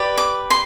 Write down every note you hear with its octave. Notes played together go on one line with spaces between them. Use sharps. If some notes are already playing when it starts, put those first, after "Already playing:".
Already playing: G4 B4 D5
D6
C6